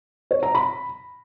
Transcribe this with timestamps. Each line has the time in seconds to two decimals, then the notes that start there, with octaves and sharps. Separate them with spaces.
0.31 C#5
0.43 A#5
0.55 B5